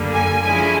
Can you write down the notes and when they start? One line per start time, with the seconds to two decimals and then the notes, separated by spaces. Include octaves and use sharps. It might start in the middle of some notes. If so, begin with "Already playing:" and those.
Already playing: F#2 D3 G3 A#3
0.14 G#5
0.43 D3 F3 G#3 C#4 E4 G#5